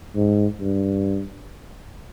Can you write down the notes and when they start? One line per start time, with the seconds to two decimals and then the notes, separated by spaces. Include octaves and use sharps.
0.15 G#2
0.60 G2